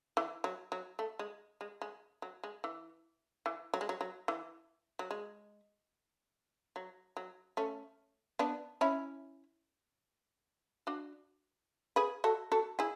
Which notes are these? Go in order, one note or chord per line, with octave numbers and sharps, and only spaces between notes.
E3
F#3
F#3
A3
G#3
G#3
G#3
F#3
G#3
E3
E3
F#3
G#3
F#3
F#3
E3
F#3
G#3
F#3
F#3
A3 C#4
B3 D4
C#4 E4
D4 F#4
G#4 B4
F#4 A4
F#4 A4
E4 G#4